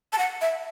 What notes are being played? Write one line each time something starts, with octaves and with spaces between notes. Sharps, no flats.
A5
F#5
E5